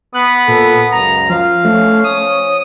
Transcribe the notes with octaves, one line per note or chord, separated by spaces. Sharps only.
B3 F#6
A#2 A4 B4
C#2 F#2 A#5
F3 F5
F3 A3 C#4 C#5
D#6